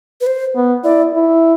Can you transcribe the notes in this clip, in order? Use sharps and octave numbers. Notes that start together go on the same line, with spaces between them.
B4
C5
B3
E4 D5
E4